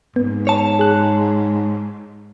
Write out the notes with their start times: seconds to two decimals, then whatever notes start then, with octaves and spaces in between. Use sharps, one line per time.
0.16 G#2 B3
0.47 C#5 A5
0.79 G#4 F#6